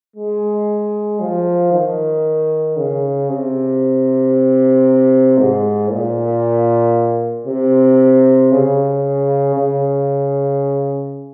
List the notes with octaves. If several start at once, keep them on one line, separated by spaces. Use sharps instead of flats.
G#3
F3
D#3
C#3
C3
G#2
A#2
C3
C#3
C#3